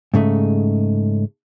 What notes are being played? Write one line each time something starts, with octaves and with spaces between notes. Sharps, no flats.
G#2 C#3 A3 D#4